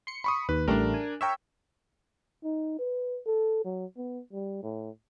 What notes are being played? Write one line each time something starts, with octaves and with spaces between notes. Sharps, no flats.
C6 C#7
B5 C#6 D#6
D#2 B4
A1 G3 A3 D4 A#4
G#5
A#4 C#5 E5 G5 C#6 E6
D#4
B4
A4
F#3
B3
G3
A2